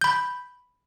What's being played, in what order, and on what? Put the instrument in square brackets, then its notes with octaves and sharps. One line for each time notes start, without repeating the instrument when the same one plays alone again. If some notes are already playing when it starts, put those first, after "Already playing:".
[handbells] B5 G6